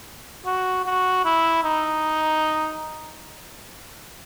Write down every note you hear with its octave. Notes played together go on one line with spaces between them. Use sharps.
F#4
F#4
E4
D#4